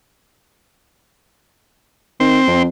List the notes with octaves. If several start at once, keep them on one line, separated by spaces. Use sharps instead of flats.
D#3 C4
F2